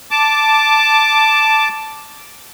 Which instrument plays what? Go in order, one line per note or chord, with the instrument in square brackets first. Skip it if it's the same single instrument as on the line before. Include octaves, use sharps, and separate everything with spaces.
[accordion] A5 D6